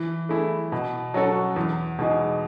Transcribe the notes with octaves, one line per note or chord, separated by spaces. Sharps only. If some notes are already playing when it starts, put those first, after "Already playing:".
Already playing: E3
A3 E4 G#4
B2
F#3 C#4 F#4 A4
E2
B2 G#3 D#4 G#4